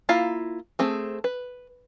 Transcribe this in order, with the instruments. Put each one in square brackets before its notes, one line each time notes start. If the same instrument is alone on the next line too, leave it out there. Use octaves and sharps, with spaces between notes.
[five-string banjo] A#3 E4 F4 F5 A#5
A3 C4 G#4
B4